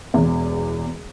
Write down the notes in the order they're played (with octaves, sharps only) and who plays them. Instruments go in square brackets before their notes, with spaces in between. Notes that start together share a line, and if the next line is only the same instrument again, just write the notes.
[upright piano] E1 E2